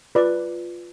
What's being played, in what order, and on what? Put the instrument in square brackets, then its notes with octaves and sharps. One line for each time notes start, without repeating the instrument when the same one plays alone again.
[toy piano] F4 D6 [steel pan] B4 D5